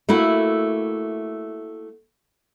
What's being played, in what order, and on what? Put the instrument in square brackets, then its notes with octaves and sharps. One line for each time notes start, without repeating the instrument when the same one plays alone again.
[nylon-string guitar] A3 A#3 E4 F#4